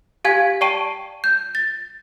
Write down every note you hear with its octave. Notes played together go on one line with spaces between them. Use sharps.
G4 F5 G#5 G#6 B6
D5 G5 A5 C#6 D7 D#7
G6
A6